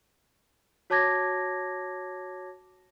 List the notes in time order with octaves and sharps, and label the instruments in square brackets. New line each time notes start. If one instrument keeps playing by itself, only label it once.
[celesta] F#4 C#5 A5 D6 G#6 A#6